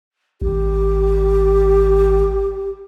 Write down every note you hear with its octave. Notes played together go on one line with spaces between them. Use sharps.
G#1 G4